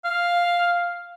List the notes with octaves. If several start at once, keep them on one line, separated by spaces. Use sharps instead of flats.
F5